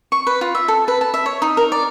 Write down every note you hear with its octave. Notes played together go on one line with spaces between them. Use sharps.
C#6
B4
F4
E5
A4
B4
A5
E5
C#5
D#4
A#4
D5